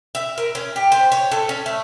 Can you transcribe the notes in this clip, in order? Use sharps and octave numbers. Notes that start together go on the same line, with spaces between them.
E5
A#4
C#4
G4
C5
C#5
A4
C#4
A3